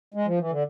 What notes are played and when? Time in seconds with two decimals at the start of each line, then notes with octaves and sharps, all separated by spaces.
0.14 G#3
0.27 F3
0.39 E3
0.51 D3